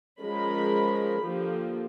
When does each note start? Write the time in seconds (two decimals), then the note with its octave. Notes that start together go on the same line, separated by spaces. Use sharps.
0.20 F3 G#3 C#4 A#4 B5
1.24 D3 F3 A#3 G4